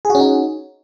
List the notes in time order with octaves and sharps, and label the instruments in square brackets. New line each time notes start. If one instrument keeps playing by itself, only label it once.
[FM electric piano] G#4
F#4
C#4
D#4